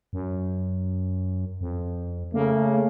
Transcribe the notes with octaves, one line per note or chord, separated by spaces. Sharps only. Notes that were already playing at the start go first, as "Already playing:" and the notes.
F#2
F2
C#3 A3 A#3